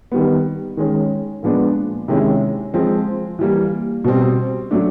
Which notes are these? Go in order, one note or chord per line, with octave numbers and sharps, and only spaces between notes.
D#3 G3 B3
D#3 G#3 C#4
A#2 F3 G#3 B3 D4
C3 D#3 G#3 C#4 E4
F3 G#3 C4
E3 G3 A#3
B2 G3 C4
F#3 A3 D4